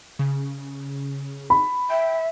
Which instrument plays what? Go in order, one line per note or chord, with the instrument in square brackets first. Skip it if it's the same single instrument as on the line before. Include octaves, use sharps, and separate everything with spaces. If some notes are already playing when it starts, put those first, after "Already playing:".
[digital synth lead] C#3
[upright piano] B5
[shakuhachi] E5 [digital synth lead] G5